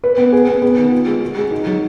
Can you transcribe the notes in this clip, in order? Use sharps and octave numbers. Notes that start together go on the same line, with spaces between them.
B4
B3
G#4
B3
B3
D#3
F4
G#3
F#4
G#3
D#4
F#3